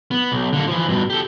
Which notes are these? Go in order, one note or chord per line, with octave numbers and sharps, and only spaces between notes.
B3
B1
D3 A#3
E3 F3
G2 B2
G4 A4